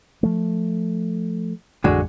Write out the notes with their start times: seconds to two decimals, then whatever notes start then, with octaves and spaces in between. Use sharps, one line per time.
0.23 F3 A3
1.84 A1 F2 D3 G#3 F#4